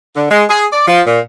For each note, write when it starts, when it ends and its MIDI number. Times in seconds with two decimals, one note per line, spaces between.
0.15 0.26 50
0.30 0.44 56
0.50 0.64 68
0.72 0.85 74
0.87 1.00 53
1.06 1.20 46